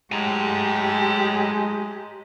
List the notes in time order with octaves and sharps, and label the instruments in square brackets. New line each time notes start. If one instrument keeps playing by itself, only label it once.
[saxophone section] A2 F#3 [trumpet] G#3 [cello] G4 [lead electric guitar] G#5 A#5